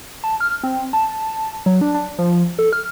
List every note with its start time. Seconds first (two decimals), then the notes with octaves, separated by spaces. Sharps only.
0.24 A5
0.40 F6
0.64 C4
0.93 A5
1.66 F#3
1.81 D4
1.94 D4
2.19 F3
2.59 A4
2.73 F6